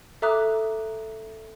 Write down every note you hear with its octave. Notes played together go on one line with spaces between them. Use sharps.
A4 E5 A#5 D6 D#6 F#6